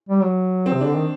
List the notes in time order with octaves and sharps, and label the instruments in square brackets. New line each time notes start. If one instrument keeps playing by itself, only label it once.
[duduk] G3
F#3
[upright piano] C4
[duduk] C3
[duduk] D3 [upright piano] D4
[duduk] D#3